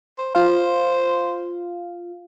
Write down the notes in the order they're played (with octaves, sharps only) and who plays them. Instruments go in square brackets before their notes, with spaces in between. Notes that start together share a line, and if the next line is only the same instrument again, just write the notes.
[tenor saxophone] C5
[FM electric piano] F4 F5 [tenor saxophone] C5